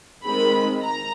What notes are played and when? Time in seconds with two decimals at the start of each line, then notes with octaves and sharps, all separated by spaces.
0.24 D#3 G#3 C4 B5
0.83 A#5